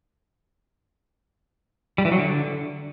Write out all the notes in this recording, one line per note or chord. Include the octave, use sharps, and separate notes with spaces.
G3
E3
F#3
D3